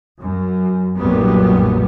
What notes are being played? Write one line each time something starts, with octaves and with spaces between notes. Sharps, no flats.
F#2
B1 F#2 A#2 F#3 G3 B3